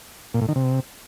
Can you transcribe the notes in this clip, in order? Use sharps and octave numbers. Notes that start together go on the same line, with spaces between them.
A#2
A2
D#3
C3